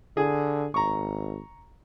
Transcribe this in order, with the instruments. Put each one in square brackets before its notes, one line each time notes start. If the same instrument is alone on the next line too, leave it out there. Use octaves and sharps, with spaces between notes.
[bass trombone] D3 [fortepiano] G#4
[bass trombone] G#1 [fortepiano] A#5 C#6